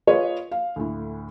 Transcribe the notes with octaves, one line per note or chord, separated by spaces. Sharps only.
F4 G#4 B4 C#5 D#5
F5
D2 A2